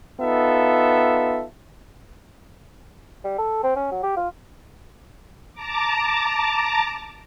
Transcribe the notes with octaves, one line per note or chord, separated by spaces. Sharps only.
B3 D#4 F4 A4 E5
G3
A4
C4
C#4
F#3
G4
F4
A5 A#5 D6